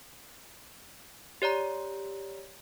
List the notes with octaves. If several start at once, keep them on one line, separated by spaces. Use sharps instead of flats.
G4 C#5 D5 A#5